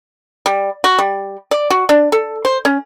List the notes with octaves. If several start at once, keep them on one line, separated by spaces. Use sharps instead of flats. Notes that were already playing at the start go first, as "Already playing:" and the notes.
G3
F#4
G3
D5
F#4
D4
A4
C5
C#4